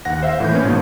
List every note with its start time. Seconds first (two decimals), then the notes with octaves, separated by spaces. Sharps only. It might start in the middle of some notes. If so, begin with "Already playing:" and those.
0.05 D#2 F#5 A#6
0.23 C5 E5 F5
0.40 A2 E3 G6
0.52 A#3 B3 C#4
0.65 G#1 G#2 B2 A#3